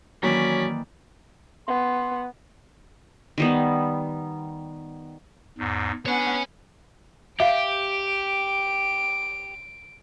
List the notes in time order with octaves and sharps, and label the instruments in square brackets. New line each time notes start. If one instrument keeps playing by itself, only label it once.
[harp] D#3 E3 A#3 [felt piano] F#3 [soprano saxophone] C#4 [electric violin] D5 B6
[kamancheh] B3 [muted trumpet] C6
[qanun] D#3 G3 B3
[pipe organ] E2 G#2
[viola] B3 F#5 [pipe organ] D4 [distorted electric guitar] C#5 G#5
[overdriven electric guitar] G4 [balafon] E5 F5 [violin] D7